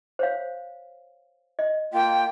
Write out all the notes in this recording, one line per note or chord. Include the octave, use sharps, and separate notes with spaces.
C5 C#5 F5
D#5
A#3 F4 G5